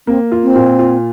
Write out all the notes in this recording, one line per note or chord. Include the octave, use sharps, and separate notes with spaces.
A#3 C4
F4
C4
A#2
F4